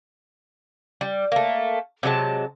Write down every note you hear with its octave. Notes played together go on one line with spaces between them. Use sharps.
G3
A3 A#3
C3 F#3 G#3 A5